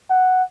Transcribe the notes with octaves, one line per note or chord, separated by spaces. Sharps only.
F#5